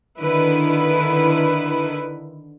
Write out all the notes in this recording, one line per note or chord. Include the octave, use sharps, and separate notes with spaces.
D3 D#3 E4 B4